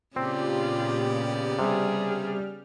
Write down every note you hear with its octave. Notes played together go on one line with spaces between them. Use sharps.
A#2 C#3 B3 C4 F4 G4 D5
C3 G3 G#4 F6